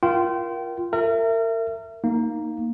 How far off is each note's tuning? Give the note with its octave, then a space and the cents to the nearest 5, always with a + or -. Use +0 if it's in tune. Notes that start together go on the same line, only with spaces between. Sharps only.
F4 -15 A#4 +20 G5 -30
A#4 -35 E5 +15
A#3 +0 D#4 +0